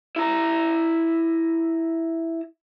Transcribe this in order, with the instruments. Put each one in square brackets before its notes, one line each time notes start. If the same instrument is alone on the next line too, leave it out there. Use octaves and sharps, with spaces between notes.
[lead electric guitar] E4 A#5